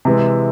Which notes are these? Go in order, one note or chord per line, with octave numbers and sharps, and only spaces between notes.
C3 E3 G#3